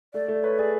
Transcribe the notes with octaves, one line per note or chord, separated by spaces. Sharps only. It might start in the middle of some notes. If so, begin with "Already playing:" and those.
A3 D5
A3
B4 C#5
G#4 D5